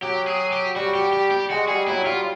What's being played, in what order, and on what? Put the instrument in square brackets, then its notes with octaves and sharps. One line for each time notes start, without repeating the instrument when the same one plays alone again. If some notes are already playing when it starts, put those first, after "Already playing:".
[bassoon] F#3 [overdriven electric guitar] G4
[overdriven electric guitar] G#4
G4
[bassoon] G3 [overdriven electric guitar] F#4
[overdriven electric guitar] G4
G4
G4
[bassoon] G#3 [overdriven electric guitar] F#4
[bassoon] G3 [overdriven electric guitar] G#4
[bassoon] F#3 [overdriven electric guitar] E4
[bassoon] G3 [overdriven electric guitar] F4